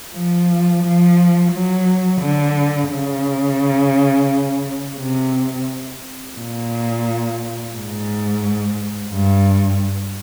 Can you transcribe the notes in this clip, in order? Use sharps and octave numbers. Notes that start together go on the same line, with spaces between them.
F3
F3
F#3
D3
C#3
C3
A#2
G#2
G2